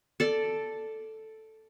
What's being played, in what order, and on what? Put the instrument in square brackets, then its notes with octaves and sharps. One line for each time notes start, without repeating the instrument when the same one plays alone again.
[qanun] A4 D5